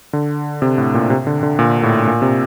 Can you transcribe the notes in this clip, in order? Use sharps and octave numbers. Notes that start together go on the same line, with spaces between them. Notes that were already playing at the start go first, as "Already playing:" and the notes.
D3
C3
A2
A#2
C3
D3
D3
A#2
A2
A#2
C3